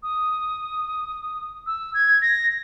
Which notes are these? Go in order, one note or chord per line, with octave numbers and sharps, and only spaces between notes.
D#6
E6
G#6
A#6